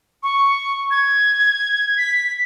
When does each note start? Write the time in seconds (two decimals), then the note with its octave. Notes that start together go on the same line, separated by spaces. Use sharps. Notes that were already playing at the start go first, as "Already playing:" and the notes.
0.23 C#6
0.91 G#6
1.98 B6